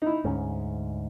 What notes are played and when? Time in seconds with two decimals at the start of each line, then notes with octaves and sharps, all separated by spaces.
0.02 D#4 E4
0.24 D2 G#2 C#4